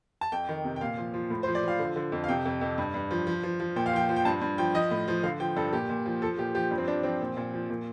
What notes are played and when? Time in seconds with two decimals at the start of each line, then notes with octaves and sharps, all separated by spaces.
0.21 A5
0.32 F2 G5
0.49 D#3
0.64 C3
0.76 G5
0.81 A#2 F5
0.97 F3
1.14 F3
1.30 A2
1.43 C5
1.47 F3
1.55 D5
1.63 F3 F5
1.79 D3
1.96 D3
2.12 F2
2.24 F5
2.28 C3 G5
2.45 F2
2.61 F2
2.78 G2
2.94 G2
3.11 F3
3.27 F3
3.43 F3
3.60 F3
3.76 A#2 G5
3.86 F5
3.93 F3 G5
4.09 F3
4.16 G5
4.25 G2 A5
4.41 G2
4.58 F3 G5
4.75 F3 D#5
4.91 A2
5.08 F3
5.23 D3 F5
5.40 F3 G5
5.56 G2 A4
5.73 A#2 G4
5.90 A#2
6.06 F3
6.22 F3 A4
6.38 A#2 G4
6.55 F3 G4
6.71 G2
6.78 C4
6.88 G2 D4
7.03 F3 C4
7.21 A#2
7.37 A#2
7.54 F3
7.70 A#2